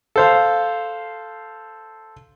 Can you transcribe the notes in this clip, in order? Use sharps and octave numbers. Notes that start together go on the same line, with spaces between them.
A4 C5 F5